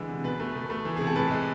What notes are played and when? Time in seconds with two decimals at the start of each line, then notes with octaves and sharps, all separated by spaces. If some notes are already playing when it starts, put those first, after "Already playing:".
Already playing: D3 E3 G#3
0.09 C3
0.24 B2 B4
0.40 A3
0.55 B2
0.70 A3
0.85 E3
0.96 C3 G#4
1.07 A4
1.16 A2 B4
1.31 G#3